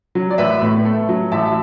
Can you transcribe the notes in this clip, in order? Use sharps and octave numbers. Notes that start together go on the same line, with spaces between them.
F#3
D5
A1 B4 E5
A2
A3
F#3
A1 E5 A5